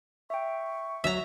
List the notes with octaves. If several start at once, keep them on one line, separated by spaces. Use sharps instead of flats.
E5 G5 C#6
D2 F#3 E5 A#5